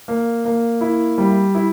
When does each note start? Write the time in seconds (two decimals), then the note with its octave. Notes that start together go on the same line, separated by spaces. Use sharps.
0.08 A#3
0.45 A#3
0.81 E4
1.18 G3
1.55 E4